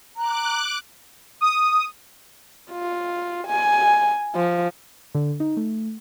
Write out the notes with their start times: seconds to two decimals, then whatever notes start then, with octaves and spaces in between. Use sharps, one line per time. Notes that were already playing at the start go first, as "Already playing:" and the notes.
0.16 A#5 D6 F#6
1.41 D#6
2.72 F4
3.47 G#5
4.35 F3
5.15 D3
5.40 D#4
5.57 A3